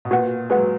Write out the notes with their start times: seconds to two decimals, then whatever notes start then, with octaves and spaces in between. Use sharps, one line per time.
0.05 B2
0.11 A#2 F#4 B4 F#5
0.50 G#3 F#4 B4 F#5
0.57 F#3